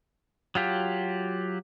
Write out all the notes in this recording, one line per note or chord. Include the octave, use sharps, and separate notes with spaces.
F#3 F4 G4